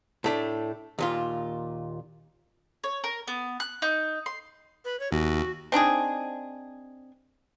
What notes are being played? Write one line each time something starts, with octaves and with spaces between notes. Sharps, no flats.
A2 A3 D4
D#2 A#2 F4
C#5
A#4
B3
F#6
D#4
C6
B4
C#5
D#2 F#4
C4 D4 D#4 G#4